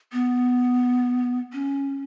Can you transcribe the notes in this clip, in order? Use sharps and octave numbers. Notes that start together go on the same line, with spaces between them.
B3
C#4